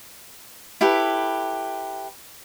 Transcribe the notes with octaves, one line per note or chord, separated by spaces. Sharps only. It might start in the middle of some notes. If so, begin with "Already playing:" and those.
E4 G4 A4 B4